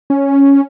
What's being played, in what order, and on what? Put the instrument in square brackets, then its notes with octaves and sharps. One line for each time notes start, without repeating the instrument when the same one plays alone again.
[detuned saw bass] C#4